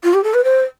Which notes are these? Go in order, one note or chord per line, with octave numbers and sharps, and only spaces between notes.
F4
G4
A4
B4
C5